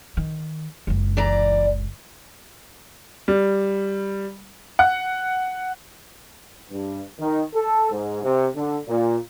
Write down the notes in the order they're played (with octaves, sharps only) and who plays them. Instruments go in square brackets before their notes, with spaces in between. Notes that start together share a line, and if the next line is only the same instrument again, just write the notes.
[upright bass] D#3
F#1 C#2
[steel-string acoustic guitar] E3 D5 A#5
[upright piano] G3
F#5
[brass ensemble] G2
D#3
A4
G#2
C3
D3
A#2